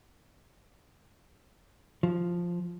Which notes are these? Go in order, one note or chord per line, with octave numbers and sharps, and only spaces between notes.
F3